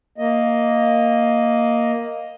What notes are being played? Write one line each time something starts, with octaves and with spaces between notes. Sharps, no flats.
A#3 D#5